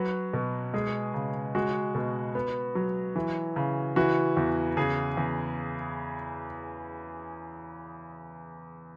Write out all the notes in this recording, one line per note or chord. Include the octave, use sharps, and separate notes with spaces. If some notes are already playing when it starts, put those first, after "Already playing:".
Already playing: F#3 F#4 B4
B2
G#3 G#4
C#3
G#3 F#4
B2
B3
F#3
E3
C#3
E3 F#4
E2
C#3 G#4
E2